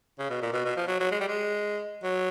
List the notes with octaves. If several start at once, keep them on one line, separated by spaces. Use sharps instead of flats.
C#3
B2
A#2
B2
B2
F3
F#3
F#3
G#3
G3
G#3
F#3